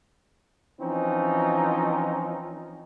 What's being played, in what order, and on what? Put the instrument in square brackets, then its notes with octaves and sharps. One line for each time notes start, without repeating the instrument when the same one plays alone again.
[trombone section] E3 F3 C4 C#4 D#4